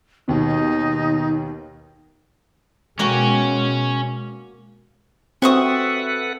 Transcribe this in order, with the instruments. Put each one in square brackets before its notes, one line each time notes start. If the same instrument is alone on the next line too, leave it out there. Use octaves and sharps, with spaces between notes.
[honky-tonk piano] D#2 B2 [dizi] D#4
[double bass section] B2 G#3 [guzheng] A#3 F#4 G5 [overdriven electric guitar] C#4
[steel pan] C4 [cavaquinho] F#4 C#6 D#6 [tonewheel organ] A4 B4 F#5 [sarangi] E5